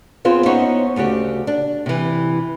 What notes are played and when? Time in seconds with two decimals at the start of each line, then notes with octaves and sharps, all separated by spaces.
0.25 B3 C4 F4 G#4 C5
0.46 B3 C#4 D#4 E4 C5 C#5
0.96 D2 C#3 F#4 G4
1.47 D4
1.86 C3 E3